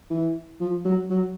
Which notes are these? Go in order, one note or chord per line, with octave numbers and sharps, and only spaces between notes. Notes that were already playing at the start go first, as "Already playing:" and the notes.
E3
F3
F#3
F#3